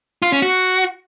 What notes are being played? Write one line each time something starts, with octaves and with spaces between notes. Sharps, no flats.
F4
C#4
F#4